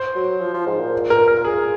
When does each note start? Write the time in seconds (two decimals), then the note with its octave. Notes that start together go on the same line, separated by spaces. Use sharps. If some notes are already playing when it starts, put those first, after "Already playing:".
Already playing: C5
0.16 F#3
0.40 F3
0.54 F3
0.66 G#2
0.79 A#2
1.10 A#4
1.28 A#4
1.44 G#4